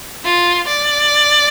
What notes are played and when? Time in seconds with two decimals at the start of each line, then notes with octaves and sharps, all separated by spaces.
0.25 F4
0.67 D5